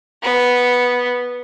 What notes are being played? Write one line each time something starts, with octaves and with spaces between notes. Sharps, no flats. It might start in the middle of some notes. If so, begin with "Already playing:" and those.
B3